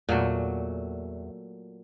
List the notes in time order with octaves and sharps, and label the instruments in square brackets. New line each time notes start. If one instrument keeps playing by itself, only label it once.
[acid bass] E2 [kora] A#2 F#3 A3